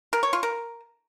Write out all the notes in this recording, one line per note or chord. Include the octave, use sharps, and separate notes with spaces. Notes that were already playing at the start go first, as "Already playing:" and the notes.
A#4
C#5
F4
A#4